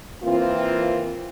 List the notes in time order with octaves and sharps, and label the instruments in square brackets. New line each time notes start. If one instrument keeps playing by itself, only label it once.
[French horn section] E3 A#3 C4 F4